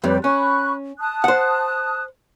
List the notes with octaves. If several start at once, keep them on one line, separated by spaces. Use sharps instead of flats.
F2 G3 G4 B4 C#5
C#4 B5 C#6 F#6
A5 D#6 F#6
C5 F#5